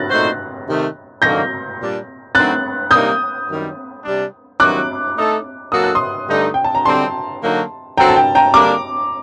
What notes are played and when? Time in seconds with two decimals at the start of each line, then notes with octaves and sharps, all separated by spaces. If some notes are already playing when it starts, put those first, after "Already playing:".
Already playing: F#6 A6 A#6
0.09 A#2 A3 D#4 F#4 C5
0.66 C3 D#3 A3
1.22 D#3 F#3 A#3 D4 A4 G6 A#6
1.79 A#2 G3 D4
2.35 F#3 A3 C4 D#4 F#4 F#6 A6
2.91 C3 G3 A#3 D#4 D#6 G6
3.47 F#2 D#3 G3
4.04 C3 G3 D4
4.60 G2 D#3 F#3 C4 F#4 D6 F#6
5.17 A3 D#4 A4
5.72 F#3 A#3 F#4 A4 D#6
5.84 F#6
5.95 C6 D#6
6.28 G2 D3 A3 D#4
6.54 G5
6.64 A5
6.75 A#5
6.84 D3 G3 C4 A5 C6
7.42 D3 F#3 A#3 D#4 F#4
7.97 F#3 C4 F#4 A4 G5 A#5
8.09 A5
8.16 G5
8.35 G5 A#5
8.54 D3 G3 A#3 D4 A#5 D6